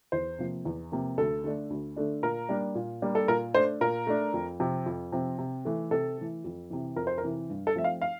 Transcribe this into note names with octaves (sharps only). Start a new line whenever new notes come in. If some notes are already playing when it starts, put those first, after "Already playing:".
E2 C5
C3 F3 A#3
E2
C3 F3 A#3
D2 A4
D3 A3 D4
D2
D3 A3 D4
A#2 A#4
G3 A#3 D4
A#2
G3 A#3 D4
A4
A#2 A#4
A3 D4 C5
A#2 A#4
A3 D4
F2
C3 F3 C4
F2
C3 F3 C4
C3
E3 A3
C3 A4
E3 A3
F2
C3 E3
F2 A#4
C5
A#4
C3 E3
G2
A4
F3 A3 C4 E5
F5
F5